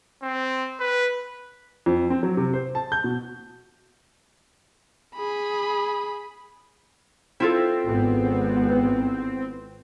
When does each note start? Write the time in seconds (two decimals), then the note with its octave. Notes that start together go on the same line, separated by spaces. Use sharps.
0.23 C4
0.80 B4
1.86 F2
2.10 C4
2.23 F#3
2.37 C3
2.53 C5
2.75 A5
2.92 G6
3.04 B2
5.15 G#4 B5
7.40 C4 E4 F4 A4
7.85 G#1 G#2 B3